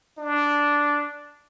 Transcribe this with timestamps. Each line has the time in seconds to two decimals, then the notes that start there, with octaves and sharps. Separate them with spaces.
0.18 D4